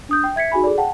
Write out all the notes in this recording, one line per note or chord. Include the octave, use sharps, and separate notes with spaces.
D4 D#6 G6
G5
E5 G#6 B6 C#7
D#4 F#4 G#4 G#5 B5
G#4 A4 D5
F#5 G5 A5